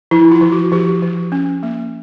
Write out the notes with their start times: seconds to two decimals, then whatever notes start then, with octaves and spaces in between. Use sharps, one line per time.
0.11 F3 E4
0.32 F4
0.41 F3
0.52 F#4
0.72 F3 G4
1.02 F3
1.32 C#4
1.63 A#3